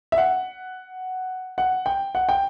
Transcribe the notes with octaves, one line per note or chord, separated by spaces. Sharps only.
E5
F#5
F#5
G5
F#5
G5